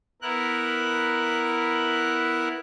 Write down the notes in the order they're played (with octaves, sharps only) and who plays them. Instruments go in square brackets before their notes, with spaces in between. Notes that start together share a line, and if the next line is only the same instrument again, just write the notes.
[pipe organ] B3 E4 A#4 F#6